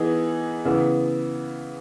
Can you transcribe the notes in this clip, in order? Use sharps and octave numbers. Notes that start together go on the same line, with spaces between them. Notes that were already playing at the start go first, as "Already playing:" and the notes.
Already playing: E3 B3 D#4 G#4
C#3 E3 B3